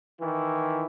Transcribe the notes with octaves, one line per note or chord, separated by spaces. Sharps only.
D#3 E3 E4